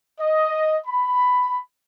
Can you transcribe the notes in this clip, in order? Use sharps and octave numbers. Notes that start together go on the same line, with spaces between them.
D#5
B5